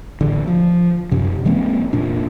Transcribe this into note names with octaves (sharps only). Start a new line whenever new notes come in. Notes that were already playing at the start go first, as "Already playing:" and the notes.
A1 D3
F3
F#2 C3
E3 G#3 A#3 C4
F1 A#2 D4